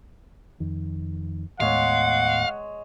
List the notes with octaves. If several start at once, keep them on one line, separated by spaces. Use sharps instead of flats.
F2 D#3
D#2 A2 G#3 B3 C#5 F5 F#5